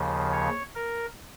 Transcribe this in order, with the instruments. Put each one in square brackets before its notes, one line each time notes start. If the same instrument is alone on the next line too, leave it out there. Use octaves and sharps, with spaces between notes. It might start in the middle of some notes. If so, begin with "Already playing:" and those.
Already playing: [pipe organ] D#2 C#3 F3
C#5
A#4